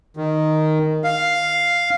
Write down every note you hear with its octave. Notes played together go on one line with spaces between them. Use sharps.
D#3
F5